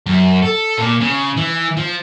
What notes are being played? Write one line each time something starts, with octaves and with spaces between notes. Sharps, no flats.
F#2
A4
A#2
C#3
E3
F3